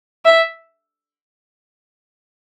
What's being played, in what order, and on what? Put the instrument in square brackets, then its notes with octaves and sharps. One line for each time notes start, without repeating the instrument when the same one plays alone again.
[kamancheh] E5